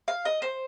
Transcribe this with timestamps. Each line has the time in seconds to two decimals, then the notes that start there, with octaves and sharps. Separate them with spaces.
0.08 F5
0.25 D#5
0.42 C5